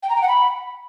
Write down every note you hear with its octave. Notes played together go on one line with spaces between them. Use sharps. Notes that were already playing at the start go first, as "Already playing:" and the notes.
G5
A#5
G5
F#5
B5